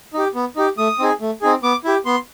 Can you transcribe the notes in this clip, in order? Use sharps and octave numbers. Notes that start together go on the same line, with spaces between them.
D#4 G4
B3
D#4 G4
A3 D#6
C4 D#4 G#4
A3
C4 D#4 G#4
B3 D6
E4 G4
B3 C6